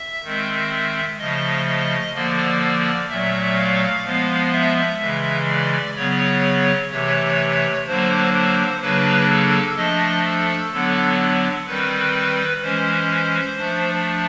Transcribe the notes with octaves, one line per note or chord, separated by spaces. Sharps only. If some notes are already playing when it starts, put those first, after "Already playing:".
Already playing: E5
D#3 G#3 C4
C#3 F3 A3 D#5
D#5
D3 F3 A#3 D5
D5
A#2 F#3 A3 E5
F5
F3 G#3 B3
E5
C#3 E3 G#3
D5
C#3 F#3 B3 C#5
C3 E3 A3 C#5
D3 F#3 A#3 D4 C5
C5
C#3 F#3 A#3 D4 B4
A4
F3 A3 D4 D#5
A4
D3 F#3 B3 D4 A4
D#3 G3 C4 B4
E3 G#3 C#4 C5
F3 A3 D4